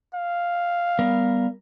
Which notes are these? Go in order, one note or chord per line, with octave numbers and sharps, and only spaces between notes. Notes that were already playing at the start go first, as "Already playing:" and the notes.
F5
G3 B3 A#4